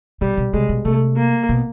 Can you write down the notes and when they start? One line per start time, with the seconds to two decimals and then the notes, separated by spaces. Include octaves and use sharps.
0.21 B2 G3
0.37 B2
0.53 C3 G#3
0.69 B2
0.85 C3 A3
1.17 A#3
1.49 B2